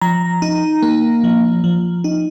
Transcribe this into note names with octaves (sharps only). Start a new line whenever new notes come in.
F3 A#5
D#4
A#3
F3
F3
D#4